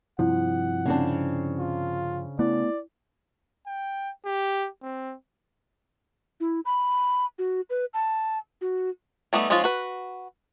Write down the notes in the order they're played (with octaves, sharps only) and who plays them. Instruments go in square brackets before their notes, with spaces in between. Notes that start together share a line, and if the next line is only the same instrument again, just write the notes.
[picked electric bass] G2 C3 F3 [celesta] E4 [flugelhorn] F#5
[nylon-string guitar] C#3 C4 D4
[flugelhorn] F4
[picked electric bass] A3 B3 [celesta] E4 [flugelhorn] D5
[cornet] G5
G4
C4
[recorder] E4
B5
F#4
B4
A5
F#4
[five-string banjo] G3 A3 B3 D#4
F3 G#3 C#4 D#4 F4
F#4 B4